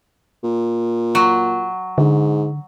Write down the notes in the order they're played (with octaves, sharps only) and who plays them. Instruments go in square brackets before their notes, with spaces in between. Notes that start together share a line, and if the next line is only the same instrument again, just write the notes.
[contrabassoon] A#2
[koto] F#3
[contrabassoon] G#2 [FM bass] D3